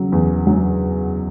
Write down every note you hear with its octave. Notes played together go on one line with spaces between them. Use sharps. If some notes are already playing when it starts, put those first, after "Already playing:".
Already playing: C#3 F#3
E2
F#3